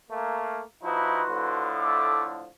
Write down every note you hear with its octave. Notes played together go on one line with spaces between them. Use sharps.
A3 A#3
F3 D#4 E4 F#4 B4 C6
A2 D3 F3
A3 D6